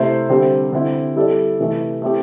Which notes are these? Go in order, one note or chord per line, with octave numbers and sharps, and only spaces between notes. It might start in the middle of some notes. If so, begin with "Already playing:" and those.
Already playing: C3 A3 E4 C5
D3 G3 C4
D3 C4 E4
G3 E4 A4 D5
C3 E3 A3
A3 C4 E4 G4